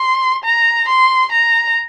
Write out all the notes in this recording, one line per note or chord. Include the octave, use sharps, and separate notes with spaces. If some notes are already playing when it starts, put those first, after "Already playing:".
Already playing: C6
A#5
C6
A#5